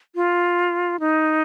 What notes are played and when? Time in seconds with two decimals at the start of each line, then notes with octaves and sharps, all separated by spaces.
0.15 F4
1.00 D#4